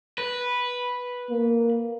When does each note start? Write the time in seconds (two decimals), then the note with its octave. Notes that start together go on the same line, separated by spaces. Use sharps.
0.18 B4
1.31 A#3